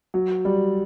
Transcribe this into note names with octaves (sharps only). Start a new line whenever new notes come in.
F#3
G3